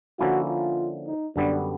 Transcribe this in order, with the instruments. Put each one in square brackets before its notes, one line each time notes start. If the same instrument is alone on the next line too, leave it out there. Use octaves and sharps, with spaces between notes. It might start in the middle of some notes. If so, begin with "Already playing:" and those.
[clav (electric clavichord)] D3 F3 A#3 C#4 E4 [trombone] F#4
[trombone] F4
D#4
[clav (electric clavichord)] F#2 D3 G3 B3 [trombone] D4